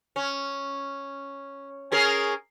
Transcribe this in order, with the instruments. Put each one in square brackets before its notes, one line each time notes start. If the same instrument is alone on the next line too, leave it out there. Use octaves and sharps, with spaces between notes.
[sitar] C#4
C#4 G#4 A#4